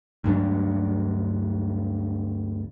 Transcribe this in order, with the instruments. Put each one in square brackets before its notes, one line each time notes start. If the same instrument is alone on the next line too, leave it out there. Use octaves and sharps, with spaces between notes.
[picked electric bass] D2 G2 F#3 D4